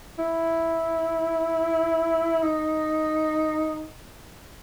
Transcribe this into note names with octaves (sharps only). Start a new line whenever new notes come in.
E4
D#4